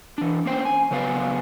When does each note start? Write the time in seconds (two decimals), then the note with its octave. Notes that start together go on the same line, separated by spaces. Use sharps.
0.18 E3 D4
0.45 A#3 C#4 C5 G5
0.65 G#5
0.91 C#3 F#3 B3 B4 F5 G#5